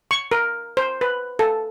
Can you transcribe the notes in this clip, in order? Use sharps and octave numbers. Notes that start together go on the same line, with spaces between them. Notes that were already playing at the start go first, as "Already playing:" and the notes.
C#6
A#4
C5
B4
A4